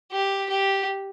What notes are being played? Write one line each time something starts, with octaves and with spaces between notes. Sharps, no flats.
G4
G4